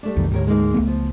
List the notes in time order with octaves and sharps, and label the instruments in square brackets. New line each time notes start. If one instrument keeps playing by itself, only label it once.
[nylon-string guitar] G3 A3 D4
[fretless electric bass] B1 F2 D#3
[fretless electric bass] D2 G#2 [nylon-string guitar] G4 A#4 C#5
[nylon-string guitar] G#3 A#3 D#4
[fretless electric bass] C#2 A3 B3
[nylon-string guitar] F3